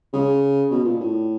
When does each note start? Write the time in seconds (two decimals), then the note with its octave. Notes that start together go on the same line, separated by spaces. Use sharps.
0.13 C#3
0.71 B2
0.84 A#2
1.00 A2